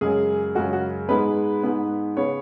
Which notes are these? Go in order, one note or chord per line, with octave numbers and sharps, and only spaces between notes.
F#2 C#3 G#3 G#4
F#2 C#3 G#3 F#4
F#4
G#2 G#3 B3 B4
G#2 G#3 B3
C#3 B3 C#5